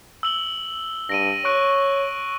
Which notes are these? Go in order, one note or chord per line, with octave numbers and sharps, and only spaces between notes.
E6 F#7 G7
G2 A#6 D7 D#7
C#5 C#6 F#6 D7